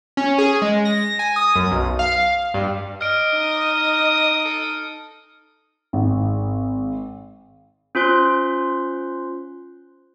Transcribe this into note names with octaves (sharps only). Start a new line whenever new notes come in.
C#4
G#4
G#3
A#6
A#6
G#5
D#6
F#2
B1
F5
G2
D#5 F6 D7
D#4 D#6
A4
G#1
C#4 F4 C5 C6 F#6